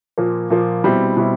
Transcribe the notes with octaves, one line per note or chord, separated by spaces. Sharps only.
A#2 F3 A#3
A#2 F3 A#3
B2 G3 C4 E4
B2 G3 C4 E4